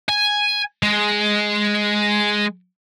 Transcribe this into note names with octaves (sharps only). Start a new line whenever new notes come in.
G#5
G#3